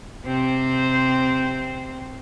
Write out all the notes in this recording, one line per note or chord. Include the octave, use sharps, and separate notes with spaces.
C3 C4 C5